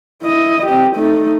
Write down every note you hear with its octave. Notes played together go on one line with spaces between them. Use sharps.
E4 D#5
C4 G4
A3 D#4